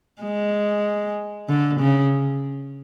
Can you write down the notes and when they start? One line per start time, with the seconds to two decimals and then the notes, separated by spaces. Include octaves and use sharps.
0.22 G#3
1.49 D3
1.80 C#3